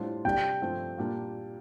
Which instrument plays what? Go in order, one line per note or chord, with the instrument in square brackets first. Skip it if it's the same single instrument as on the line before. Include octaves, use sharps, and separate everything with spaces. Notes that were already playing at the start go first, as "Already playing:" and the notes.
Already playing: [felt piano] A2 G3 D4 F4 C5
[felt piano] C3 G3 D4 G4 D5 [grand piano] G5
[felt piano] G2 F3 A3 C4
A#2 G3 A#3 D4